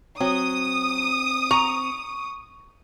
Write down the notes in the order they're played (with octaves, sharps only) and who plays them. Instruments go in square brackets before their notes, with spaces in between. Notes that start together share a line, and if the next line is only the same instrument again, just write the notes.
[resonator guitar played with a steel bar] F#3 [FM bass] C4 [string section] D#6
[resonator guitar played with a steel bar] A#5 [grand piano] C#6